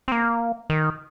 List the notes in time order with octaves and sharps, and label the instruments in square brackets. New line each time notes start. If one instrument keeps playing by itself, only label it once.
[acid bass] C4
A#3
D#3